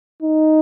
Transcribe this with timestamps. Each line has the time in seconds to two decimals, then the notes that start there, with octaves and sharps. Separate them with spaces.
0.22 D#4